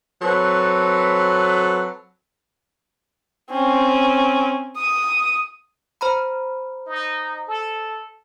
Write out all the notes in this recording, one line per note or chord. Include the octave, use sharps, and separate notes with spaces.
F#3 C4 A4 B4
C4 C#4
D#6
C5 A#5 B5
D#4
A4